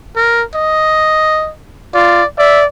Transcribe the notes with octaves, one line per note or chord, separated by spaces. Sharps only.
A#4
D#5
F4 D5
D5 E5